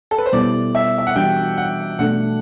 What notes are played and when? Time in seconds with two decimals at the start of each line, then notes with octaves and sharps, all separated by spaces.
0.11 A4
0.18 B4
0.26 C5
0.33 B2 G3 B3 E4 A4 D5
0.75 E5
0.98 E5
1.07 F#5
1.16 E3 G3 D4 F#4 G5
1.58 F#5
1.99 B2 A3 D4 A4 F#5